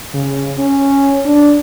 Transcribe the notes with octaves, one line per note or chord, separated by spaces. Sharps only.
C#3
C#4
D4